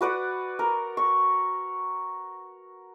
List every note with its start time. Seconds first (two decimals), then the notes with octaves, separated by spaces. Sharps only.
0.01 F#4 B4 D5 F#5
0.59 A#4
0.97 C#6